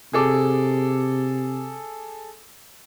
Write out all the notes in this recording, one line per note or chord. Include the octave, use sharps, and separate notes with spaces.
C3 G#4 A4 D6